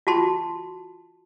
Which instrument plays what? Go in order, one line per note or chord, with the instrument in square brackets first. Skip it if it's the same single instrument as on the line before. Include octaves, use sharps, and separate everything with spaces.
[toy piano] F4 F#4 A5 C6